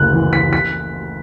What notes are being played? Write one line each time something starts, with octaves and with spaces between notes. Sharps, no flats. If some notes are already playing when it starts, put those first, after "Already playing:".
Already playing: F#1 D2 F#6
E3
B6
B6